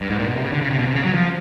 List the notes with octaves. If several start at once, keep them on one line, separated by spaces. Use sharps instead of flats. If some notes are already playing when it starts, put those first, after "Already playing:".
G2
G#2
A#2
B2
C3
C#3
D3
C#3
C3
B2
C3
C#3
F#3
F3